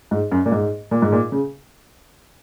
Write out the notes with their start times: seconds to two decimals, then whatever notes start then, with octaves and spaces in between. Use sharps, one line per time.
0.11 G#2
0.31 F#2
0.46 A#2
0.52 G#2
0.91 A#2
1.02 G#2
1.12 A#2
1.32 C#3